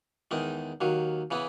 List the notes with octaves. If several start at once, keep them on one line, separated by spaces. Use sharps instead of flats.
E2 D#3 G#3 D#4
D#2 D#3 F#3
C#3 E3 B3 E4